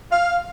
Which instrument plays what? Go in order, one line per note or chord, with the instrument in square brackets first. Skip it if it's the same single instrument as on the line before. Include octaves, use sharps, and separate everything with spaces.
[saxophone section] F5